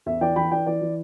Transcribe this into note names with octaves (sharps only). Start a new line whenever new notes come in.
E2 E5
E3 D5 G5
E3 G5 B5
E3 D5 G5
E3 D5
E3